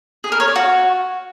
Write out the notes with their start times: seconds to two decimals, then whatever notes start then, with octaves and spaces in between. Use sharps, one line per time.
0.24 G#4
0.32 A#4
0.40 C#5
0.48 D5
0.56 F#4